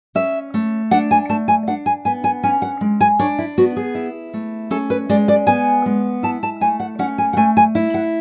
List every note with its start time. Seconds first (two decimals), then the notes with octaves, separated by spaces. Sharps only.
0.15 C#4 E5
0.54 A3
0.91 D4 F#5
1.11 G#5
1.29 A3 A5
1.48 G#5
1.67 D4 F#5
1.86 G#5
2.05 B3 G#5
2.24 G#5
2.43 C#4 G#5
2.62 F#5
2.81 G#3
3.01 G#5
3.19 D4 C#5
3.39 E4
3.58 B3 F#4
3.77 G#4
3.95 E4
4.34 A3
4.71 C#4 A4
4.90 B4
5.09 G#3 D5
5.28 D5
5.47 B3 G#5
5.86 G#3
6.23 E4 A5
6.43 A5
6.61 A3 G#5
6.80 F#5
6.99 C#4 F#5
7.18 G#5
7.33 F#5
7.37 A3 G#5
7.57 G#5
7.75 E4
7.94 F#5